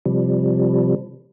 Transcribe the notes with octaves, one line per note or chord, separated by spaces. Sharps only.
C3 F3 G3